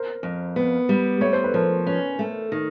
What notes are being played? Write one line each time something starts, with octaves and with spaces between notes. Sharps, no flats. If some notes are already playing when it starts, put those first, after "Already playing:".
Already playing: A#4 C5
F2
B3
G3
A3 C#5
C5
B4
F3 A#4 C5
C#4 B4 C#5
A3
D#3